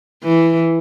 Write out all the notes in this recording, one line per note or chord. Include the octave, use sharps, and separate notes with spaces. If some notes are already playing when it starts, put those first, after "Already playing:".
E3